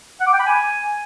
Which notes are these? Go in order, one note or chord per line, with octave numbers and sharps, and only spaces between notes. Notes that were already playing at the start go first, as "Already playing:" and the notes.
F#5
D6
G5
B5
G#5